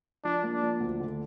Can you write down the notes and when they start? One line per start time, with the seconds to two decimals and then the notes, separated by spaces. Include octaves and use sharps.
0.24 F3 D4
0.43 A#3
0.52 D4
0.62 F3
0.80 D2
1.00 D3